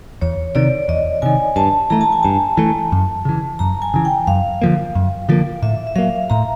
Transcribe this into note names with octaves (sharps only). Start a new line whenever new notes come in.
E2 C#5
C3 D#3 D5
E2 D#5
C3 D#3 G#5
G2 A5
E3 A3 A#5
A5
G#5
G2 A5
E3 A3
F#2
C#3 E3
F#2 A#5
G#5
C#3 E3
G5
F#2 F5
D3 F3 A#3
F#2
D3 F3 A#3
A2 E5
E5
F#3 A#3 F5
A2 A#5